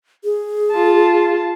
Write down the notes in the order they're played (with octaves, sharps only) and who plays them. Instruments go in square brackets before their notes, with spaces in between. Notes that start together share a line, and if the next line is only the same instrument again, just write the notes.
[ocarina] G#4
[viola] F4 A5